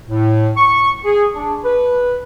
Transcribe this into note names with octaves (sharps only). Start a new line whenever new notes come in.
A2
C#6
G#4
D4
B4